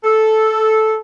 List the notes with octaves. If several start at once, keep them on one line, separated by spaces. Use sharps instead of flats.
A4